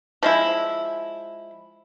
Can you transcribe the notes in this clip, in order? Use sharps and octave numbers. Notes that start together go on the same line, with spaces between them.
F3 G#3 E4